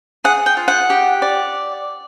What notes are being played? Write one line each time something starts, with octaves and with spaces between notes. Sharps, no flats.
G#4 F#5
G5
F4
F#5
G4
D5